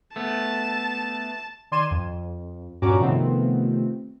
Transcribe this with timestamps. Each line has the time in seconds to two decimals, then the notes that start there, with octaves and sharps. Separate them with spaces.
0.16 A3 B3 A5
1.71 D#3 D5 C6 G#6 D#7 E7
1.91 F2
2.82 G2 A#2 C#4 F#4 A#5 D6
2.99 C3 D#3 F3 A3 B3 C4